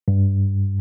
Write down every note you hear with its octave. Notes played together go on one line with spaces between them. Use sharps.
G2